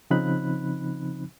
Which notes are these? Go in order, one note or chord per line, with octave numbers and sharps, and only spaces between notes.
C#3 F3 C4 D#4 B5 F#6